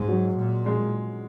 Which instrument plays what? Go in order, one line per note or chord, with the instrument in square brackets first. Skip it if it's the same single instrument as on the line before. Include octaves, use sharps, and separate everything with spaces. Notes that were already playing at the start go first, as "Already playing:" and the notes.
Already playing: [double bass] G#2 [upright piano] G#3
[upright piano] F#3
[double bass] A#2
[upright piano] G#3